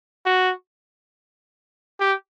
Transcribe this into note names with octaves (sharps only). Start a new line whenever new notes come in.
F#4
G4